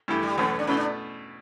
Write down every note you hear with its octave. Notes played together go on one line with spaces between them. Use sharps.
G2 E3 A3 E4 G4
G3
E2 B2 F#3 A3 B3 C#4
D4
B2 A3 C#4 E4 B4
D4